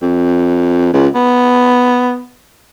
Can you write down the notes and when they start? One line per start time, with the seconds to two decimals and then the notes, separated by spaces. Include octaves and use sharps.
0.02 F2
0.93 C#2
1.15 B3